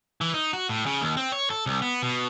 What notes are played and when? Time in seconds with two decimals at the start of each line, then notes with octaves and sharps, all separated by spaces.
0.21 E3
0.34 D#4
0.53 F#4
0.69 A2
0.86 C#3
1.01 D#2
1.17 C4
1.32 C#5
1.50 A4
1.66 C2
1.82 B3
2.02 B2